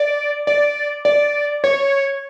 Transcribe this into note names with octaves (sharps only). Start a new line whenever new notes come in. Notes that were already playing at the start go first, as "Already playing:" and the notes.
Already playing: D5
D5
D5
C#5